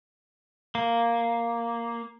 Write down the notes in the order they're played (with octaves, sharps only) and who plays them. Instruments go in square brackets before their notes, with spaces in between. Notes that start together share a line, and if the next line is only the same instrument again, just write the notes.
[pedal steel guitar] A#3